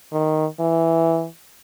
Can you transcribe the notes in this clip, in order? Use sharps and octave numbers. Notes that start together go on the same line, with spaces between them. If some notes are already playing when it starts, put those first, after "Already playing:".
D#3
E3